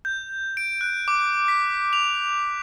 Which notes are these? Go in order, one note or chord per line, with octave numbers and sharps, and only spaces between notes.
G6
D7
F#6
D6
B6
F7